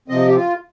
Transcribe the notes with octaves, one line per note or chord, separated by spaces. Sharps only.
C3 F3 C4 D#5
G4
F4